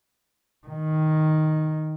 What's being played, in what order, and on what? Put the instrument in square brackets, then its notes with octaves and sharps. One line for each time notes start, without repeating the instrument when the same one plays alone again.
[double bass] D#3